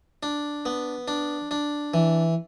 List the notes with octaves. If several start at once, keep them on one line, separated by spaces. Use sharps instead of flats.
D4
B3
D4
D4
E3